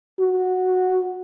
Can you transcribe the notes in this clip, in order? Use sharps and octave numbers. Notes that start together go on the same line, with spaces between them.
F#4